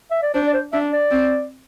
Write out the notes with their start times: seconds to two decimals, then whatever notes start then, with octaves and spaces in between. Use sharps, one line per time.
0.11 E5
0.23 D5
0.34 D4 C5
0.47 D5
0.54 C5
0.73 D4 E5
0.92 D5
1.11 C4